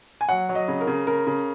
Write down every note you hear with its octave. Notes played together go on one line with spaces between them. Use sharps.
G#5
F#3 F#5
F#3
D#5
C#3
A#4
C#3
C#3 A#4
C#3